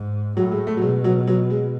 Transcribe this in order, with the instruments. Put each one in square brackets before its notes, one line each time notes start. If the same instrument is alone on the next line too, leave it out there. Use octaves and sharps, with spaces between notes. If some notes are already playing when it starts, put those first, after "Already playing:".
Already playing: [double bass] G#2
[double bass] A2 [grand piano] F#3
[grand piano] G#3
A3
F#3
[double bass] B2 [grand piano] G#3
[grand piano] F#3
F#3
G#3